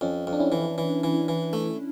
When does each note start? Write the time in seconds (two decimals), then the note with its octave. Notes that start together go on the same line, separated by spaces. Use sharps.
0.01 F2 C#4
0.27 F2
0.33 D4
0.40 C#4 E4
0.52 E3
0.78 E3
1.04 E3
1.28 E3
1.53 A3